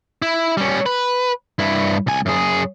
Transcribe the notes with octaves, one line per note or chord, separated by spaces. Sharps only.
E4
G3 C#4
B4
G2 E4
C2 G#5
F#2 G#4